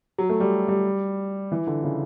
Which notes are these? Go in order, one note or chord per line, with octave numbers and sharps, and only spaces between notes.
F#3
A3
G3
G3
E3
D3
C#3